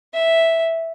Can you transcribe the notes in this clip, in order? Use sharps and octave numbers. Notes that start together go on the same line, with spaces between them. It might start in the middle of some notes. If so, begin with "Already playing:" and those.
E5